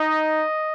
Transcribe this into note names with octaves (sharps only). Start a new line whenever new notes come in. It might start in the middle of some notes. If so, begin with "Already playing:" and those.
Already playing: D#4 D#5